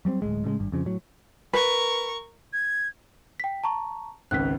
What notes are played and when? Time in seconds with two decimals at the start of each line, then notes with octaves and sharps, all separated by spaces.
0.05 F#3 G3 B3 C4
0.22 D1 D#2 A2 G#3
0.44 A2 C#3 G3 G#3
0.59 G#1 G2
0.72 F2 C#3 F3
0.85 A2 F#3
1.53 A#4 B4 C#6
2.53 G#6
3.40 G5 B6
3.64 A5 A#5 C#6
4.31 G#1 C#2 F#6 B6